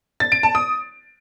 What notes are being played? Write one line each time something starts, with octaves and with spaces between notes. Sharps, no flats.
A6
D7
A5
D#6